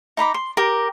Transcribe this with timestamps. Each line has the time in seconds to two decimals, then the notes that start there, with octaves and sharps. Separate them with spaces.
0.17 D#4 A#5 B5 D6
0.34 C6
0.57 G4 A#4